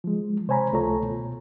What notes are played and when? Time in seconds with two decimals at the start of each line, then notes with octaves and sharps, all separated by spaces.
0.04 F3 G#3
0.48 C3 C5 C#5 G#5 A#5 B5
0.72 C#2 A3 F4 A4 C#5 A#5
1.02 B2